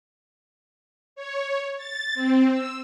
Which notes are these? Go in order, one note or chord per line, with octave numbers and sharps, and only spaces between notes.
C#5
A6
C4
E6